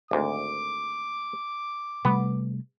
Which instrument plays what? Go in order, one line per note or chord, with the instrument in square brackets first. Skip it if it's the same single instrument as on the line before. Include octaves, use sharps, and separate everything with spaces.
[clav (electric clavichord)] G#1 D2 [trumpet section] D6
[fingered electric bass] C3 G3 A3 [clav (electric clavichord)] B3